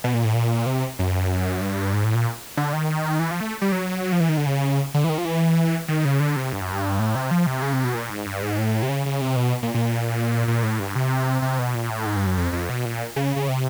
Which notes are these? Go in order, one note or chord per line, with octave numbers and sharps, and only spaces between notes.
B2
A#2
A2
A#2
C3
F#2
G2
G#2
A2
A#2
D3
D#3
E3
F3
A3
G3
F#3
F3
E3
D#3
D3
C#3
D3
E3
D#3
F3
E3
D#3
C#3
D3
C3
G2
F#2
G2
A2
C3
F3
C3
C#3
C3
B2
A#2
G#2
G2
G#2
A2
C3
C#3
C#3
C3
B2
A#2
A#2
A#2
A2
G2
C3
C3
B2
A#2
A2
G#2
G2
F#2
F2
F2
B2
A#2
C#3
C#3
C3